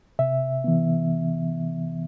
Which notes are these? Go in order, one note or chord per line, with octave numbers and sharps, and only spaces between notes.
C3 E5
E3 B3